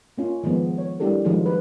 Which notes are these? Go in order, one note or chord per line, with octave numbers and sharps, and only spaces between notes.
A#3 C#4 F4
D#3 F3 G#3 B3
C#5
G3 D4 E4 G4 A4 A#4
D#3 F3 F#3 G#3 D#4
B4